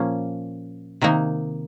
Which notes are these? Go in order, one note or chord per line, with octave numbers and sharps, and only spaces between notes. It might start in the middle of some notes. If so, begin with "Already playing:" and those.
Already playing: A#2 F3 A#3 C#4
C3 D#3 A#3 D#4